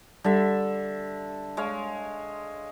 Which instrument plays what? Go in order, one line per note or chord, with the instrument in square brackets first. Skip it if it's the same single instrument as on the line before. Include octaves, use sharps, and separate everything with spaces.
[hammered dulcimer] D3 A4 E5 [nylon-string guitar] G3
[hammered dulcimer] G#3 C#5 F5